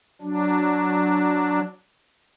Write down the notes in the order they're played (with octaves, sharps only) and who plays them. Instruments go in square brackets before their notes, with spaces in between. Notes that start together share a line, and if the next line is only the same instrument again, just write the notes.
[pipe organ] F#3 D4